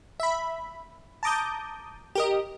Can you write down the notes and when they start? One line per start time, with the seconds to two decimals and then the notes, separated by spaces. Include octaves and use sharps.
0.20 E5 B5
1.23 A5 A#5 D6 D#6 G6
2.15 G4 A#4 D#5